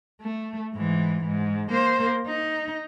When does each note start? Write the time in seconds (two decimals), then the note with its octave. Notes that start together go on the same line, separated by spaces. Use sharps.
0.21 A3
0.75 G#2 E3
1.26 G#2
1.70 A#3 C5
2.27 D#4